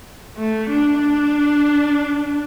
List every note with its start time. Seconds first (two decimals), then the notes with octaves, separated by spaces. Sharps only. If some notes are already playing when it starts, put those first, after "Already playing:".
0.38 A3
0.70 D4
1.01 D4